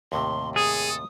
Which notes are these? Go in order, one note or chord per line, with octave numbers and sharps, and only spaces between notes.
D#2 A2 C3 C6
G#4 A4 D#6